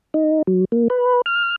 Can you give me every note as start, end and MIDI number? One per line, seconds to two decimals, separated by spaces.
0.14 0.42 63
0.47 0.65 54
0.72 0.88 58
0.90 1.21 71
1.26 1.56 89